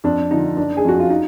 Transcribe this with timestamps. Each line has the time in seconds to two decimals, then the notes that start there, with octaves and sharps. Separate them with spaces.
0.04 F2 D4
0.31 D3 F3 D#4
0.57 F#1 D4
0.77 G#4
0.84 F2 F3 F#4
1.00 F4
1.10 D#4